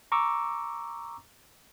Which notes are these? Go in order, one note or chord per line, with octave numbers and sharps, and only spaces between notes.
A#5 C#6 D6 E6